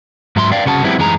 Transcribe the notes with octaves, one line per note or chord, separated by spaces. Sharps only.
G#2 F#3 E5 B5 C6
D5 F5 G5
C2 C#3 F#4 A4 A5
F#3 G#3 B3 C4 E4 G4
F#2 E3 G#3 G#4 A#5